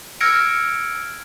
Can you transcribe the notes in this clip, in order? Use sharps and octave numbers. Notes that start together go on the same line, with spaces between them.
E6 F6 G#6 A#6 C#7 D7